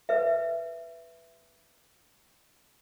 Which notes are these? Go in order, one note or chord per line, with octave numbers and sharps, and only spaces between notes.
B4 E5